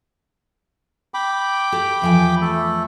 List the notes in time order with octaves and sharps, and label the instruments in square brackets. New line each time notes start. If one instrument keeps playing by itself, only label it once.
[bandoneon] G5 B5 D6
[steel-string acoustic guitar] G4 A4
E2 F3 G#5
[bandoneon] A3 A4